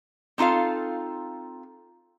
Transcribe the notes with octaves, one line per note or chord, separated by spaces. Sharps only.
C4 D#4 F4 A4 F5